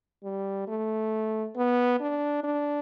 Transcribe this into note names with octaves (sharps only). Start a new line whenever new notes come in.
G3
A3
B3
D4
D4